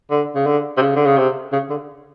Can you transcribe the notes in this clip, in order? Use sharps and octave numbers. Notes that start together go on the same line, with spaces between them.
D3
C#3
D3
C3
C#3
D3
C#3
C3
C#3
D3